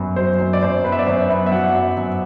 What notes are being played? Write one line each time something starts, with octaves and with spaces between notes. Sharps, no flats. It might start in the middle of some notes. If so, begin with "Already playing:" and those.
Already playing: F#2 B3
F#3 C5
F#2
D5
F#2 C5
B3 B4
E5
D5
F#2 C5
B3 E5
E5
F#3 F#5
F#2
F#2